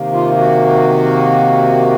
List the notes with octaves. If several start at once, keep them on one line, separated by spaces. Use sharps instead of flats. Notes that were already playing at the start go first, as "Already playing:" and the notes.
Already playing: C3 D#3 A#3
F4
F#4